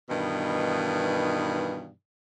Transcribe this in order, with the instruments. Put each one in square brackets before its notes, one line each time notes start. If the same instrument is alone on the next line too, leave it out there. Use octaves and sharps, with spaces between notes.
[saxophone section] G2 B2 D#3 E3 D#4